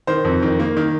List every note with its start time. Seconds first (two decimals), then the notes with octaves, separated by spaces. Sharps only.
0.07 D#3 C5
0.25 F2
0.42 D#3
0.60 A#3
0.77 D#3